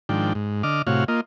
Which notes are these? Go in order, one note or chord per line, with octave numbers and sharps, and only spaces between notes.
G#2 D#3 F3 D4 G5
G#2
D3 D#5 D6 F6
A2 C3 F#4 C#5 F5
A#3 F4 D#5